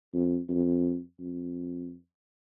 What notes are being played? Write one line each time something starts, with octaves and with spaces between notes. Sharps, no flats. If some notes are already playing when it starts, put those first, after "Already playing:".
F2
F2
F2